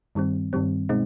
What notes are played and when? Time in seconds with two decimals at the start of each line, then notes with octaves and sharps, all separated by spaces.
0.15 G2 D#3 G3 C4
0.53 G2 D#3 G3 C4
0.89 B2 G#3 C4 D#4